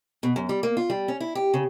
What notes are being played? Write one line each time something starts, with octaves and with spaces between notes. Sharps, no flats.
B2
F#2
G3
A#3
F4
G3
C#4
E4
G4
C#3